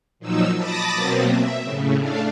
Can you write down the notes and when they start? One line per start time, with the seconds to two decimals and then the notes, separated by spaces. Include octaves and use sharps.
0.19 A#2 F3 F#3 D#4 E6
0.56 A5 B5 D6 D#6 A6 A#6
0.94 B2 F#3 A#3 C4
1.31 E5
1.62 A2 C#3
1.96 A3 D4 F5